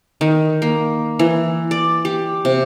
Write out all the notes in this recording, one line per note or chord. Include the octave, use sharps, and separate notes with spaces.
D#3
A#3
E3
D5
G4
C3